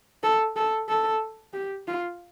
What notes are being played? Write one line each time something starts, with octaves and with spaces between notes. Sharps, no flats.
A4
A4
A4
G4
F4